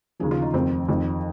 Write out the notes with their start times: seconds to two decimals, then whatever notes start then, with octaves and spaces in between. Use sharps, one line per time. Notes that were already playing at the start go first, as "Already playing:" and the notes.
0.19 D#2 C#3 F3 G#4
0.31 F4
0.42 D#4
0.54 F2 D#3 C4
0.89 F2 D#3